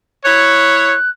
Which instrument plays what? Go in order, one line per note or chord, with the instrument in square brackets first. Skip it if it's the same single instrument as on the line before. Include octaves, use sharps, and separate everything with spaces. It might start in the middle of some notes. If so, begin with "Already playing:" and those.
[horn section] E4 C#5 [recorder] F#6